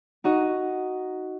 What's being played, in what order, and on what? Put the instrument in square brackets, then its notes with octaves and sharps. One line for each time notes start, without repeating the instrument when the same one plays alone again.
[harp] D#4 F#4 D#5